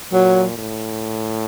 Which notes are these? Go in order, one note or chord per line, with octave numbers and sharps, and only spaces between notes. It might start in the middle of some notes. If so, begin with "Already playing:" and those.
A#2 F#3
A2